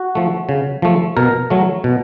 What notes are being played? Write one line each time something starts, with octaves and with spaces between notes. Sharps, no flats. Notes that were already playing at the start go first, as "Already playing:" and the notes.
Already playing: F#4
F3 A3
C#3
F3 A3
B2 A#4
F#3 A3
B2